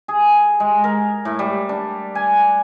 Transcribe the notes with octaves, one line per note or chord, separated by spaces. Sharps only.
G#4
G#3
A#4
A2
G3
D4
G#5